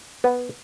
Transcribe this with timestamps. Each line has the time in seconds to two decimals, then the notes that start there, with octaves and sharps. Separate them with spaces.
0.24 B3